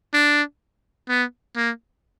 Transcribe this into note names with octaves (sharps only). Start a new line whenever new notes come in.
D4
B3
A#3